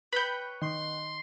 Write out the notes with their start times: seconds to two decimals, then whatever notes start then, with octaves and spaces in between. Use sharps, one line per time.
0.13 B4 C#5 G5 B5 G6
0.62 D#3 C6